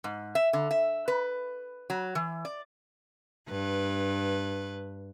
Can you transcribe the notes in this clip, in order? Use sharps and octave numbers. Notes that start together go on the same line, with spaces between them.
G#2
E5
D3
E5
B4
F#3
E3
D5
G2 B4